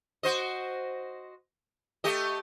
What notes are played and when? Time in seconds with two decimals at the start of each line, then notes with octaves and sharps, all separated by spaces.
0.23 F#4 C5 D#5
2.04 A3 G4 D#5